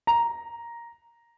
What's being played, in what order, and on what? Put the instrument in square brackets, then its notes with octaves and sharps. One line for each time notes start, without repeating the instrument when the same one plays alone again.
[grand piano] A#5